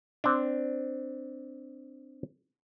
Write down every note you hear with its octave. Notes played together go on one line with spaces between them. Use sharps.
C4 D4